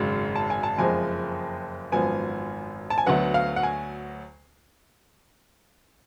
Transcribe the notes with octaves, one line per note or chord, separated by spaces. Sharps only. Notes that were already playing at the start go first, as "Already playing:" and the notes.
Already playing: G#1 F#2 C#3 G#3
A5
G#5
A5
F#1 F2 F3 G#3 G#5
G#1 F#2 F3 B3 G#5
A5
G#5
D2 D3 F#3 B3 F#5
F5
F#5
G#5